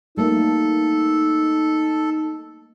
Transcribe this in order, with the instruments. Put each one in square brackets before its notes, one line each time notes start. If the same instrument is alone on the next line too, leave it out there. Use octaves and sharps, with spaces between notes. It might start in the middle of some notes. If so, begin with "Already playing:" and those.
[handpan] G3 A3 A#3 [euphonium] D#4 [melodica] A4